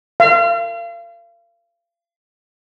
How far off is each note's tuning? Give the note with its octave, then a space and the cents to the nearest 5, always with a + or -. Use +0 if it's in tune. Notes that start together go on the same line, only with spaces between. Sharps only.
F5 -35